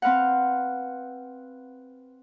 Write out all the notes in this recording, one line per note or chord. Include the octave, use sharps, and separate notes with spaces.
C4 B4 F5 F#5